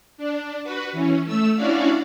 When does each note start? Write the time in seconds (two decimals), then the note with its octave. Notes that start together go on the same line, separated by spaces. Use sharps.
0.18 D4
0.64 F#4 B4
0.92 E3 C#4
1.24 A3 E6
1.55 C#4 D4 E4 F#4 D5 F5